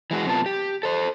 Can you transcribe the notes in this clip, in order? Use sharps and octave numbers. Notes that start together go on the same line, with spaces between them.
E3 G#3 F#4
F#2 C3 A3 B3 F4 A5
G4
A4 C5